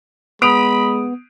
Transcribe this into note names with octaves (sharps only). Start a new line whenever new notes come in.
G#3 B3 B5 D#6 D7 F7